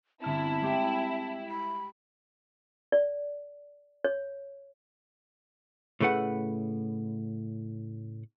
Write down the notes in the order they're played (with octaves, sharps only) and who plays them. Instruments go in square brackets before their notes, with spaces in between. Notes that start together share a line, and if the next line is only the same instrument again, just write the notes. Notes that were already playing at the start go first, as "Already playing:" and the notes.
[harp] G1 F6 E7 [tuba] C4 [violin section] E4 [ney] A5
[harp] G#3 G4 G5
[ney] B5 [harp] B6
[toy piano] D5
C#5
[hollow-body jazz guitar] A2 C#3 A3 B4 F#5